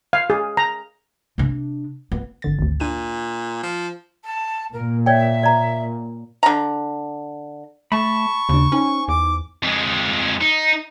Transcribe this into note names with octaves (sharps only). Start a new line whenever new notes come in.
F5
G#4
A#5
C3 D4
B3
G#1 D3 A6
G#1 D2
A#2 D4 D#7
F3
A5
A#2 A#4
C#5 D5 E5 G5
D5 A#5
D3 A#5
A3 A5 B5 C#6
D#2 C#3 D4
C#4 D#4 C5 G#5
E2 D6
F2 G#3
D#4